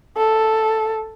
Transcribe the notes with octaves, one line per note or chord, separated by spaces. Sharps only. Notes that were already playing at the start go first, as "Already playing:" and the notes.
A4